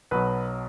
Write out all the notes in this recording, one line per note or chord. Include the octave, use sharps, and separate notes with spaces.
B1 B2 F#3 B4